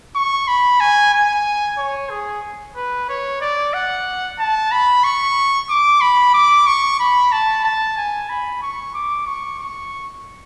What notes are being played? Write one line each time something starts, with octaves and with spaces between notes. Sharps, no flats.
C#6
B5
G#5
G#5
C#5
G#4
B4
C#5
D5
F#5
A5
B5
C#6
D6
B5
D6
C#6
B5
A5
A5
G#5
B5
C#6
D6
C#6
C#6